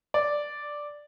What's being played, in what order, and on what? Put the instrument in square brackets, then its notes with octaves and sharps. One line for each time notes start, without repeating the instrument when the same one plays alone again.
[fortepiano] D5